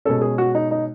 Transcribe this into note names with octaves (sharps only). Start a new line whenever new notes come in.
B2 G#3 C#4 A4
G#4
F#4
D#4
D#4